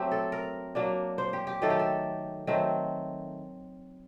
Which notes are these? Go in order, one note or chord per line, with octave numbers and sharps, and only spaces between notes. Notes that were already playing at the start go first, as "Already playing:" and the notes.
Already playing: F#3 A3 C4 G4
A4
A#4
F#3 A#3 D4
C5
G4
G4
D#3 F#3 A3 A4
G4
A4
D#3 F#3 A3 C4